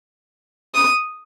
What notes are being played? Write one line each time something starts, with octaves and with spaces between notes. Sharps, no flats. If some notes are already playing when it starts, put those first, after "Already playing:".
D#6